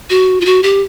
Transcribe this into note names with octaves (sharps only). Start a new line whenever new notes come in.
F#4
F4
F#4
G4